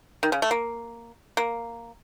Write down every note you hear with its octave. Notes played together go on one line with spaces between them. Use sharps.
D#3
C#3
A3
A#3
A#3